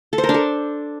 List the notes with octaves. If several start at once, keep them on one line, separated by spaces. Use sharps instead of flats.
A4
C5
A#4
D4
A4